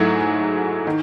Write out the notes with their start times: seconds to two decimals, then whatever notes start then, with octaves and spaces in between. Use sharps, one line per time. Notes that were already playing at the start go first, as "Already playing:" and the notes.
Already playing: G#2 F#3 A3 E4 G#4
0.87 D#3